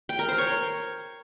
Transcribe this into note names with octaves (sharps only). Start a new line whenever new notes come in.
G5
A#4
C5
C#5